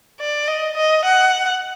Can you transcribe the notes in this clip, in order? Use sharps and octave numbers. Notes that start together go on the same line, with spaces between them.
D5
D#5
D#5
F#5